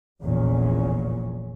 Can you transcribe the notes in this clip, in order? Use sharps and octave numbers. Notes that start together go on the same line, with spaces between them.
F1 A#1 E2 A#2 C#4